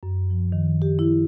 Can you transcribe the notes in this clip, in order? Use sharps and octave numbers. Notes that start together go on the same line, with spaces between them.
F#2
F3
D#3
G4
E4